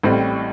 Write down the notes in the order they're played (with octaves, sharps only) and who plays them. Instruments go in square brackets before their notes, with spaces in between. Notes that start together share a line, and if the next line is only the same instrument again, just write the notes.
[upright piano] A1 A2 G3 C4